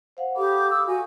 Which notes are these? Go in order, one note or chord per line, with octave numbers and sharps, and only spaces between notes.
C5 F5 F#5
G4 A4 F5 B5 D6 D#6
D6 E6
F#4 D#5 G#5